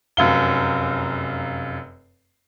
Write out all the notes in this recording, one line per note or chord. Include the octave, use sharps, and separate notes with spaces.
F1 F#2 F5 G7